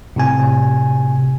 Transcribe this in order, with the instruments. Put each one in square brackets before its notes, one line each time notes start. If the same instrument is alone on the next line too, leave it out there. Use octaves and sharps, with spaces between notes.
[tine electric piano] A2 C3 G#5